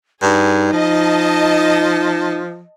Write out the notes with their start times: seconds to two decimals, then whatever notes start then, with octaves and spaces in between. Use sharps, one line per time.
0.23 G2 D#4 G#4
0.73 F3 D#5 A5